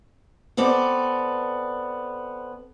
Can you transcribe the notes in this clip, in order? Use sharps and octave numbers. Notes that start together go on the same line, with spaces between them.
B3 C4 A4 D5